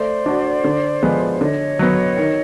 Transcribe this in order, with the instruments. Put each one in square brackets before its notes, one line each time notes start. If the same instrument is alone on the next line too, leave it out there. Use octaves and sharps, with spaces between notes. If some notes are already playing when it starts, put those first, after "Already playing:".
Already playing: [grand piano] A3 [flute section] C5 D5
[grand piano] D4 F#4
D3
F3 G#3 B3
[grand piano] D3 [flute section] C#5 D#5
[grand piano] F#3 B3
D#3